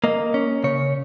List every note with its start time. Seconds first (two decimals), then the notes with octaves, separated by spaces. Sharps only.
0.04 A#3 D#5
0.34 C#4
0.64 C#3 C#5